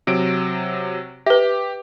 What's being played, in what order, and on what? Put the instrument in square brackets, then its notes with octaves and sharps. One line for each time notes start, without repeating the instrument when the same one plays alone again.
[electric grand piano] C3 F#3 D7
[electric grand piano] G4 [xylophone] B4 E5